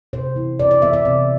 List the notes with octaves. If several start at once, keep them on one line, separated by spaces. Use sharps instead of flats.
C3 C5
E3 B3 E4
C3 D5
D5
E3 B3 E4 E5
E5
C3 D5